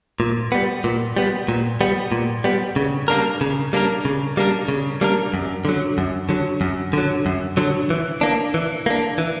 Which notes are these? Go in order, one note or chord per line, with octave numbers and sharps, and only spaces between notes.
A#2
G3 B3
A#2
G3 B3
A#2
G3 B3
A#2
G3 B3
C#3
G3 A#3 D4 A#4
C#3
G3 A#3 D4 A#4
C#3
G3 A#3 D4 A#4
C#3
G3 A#3 D4 A#4
F#2
D3 F#3
F#2
D3 F#3
F#2
D3 F#3
F#2
D3 F#3
E3
A#3 D4
E3
A#3 D4
E3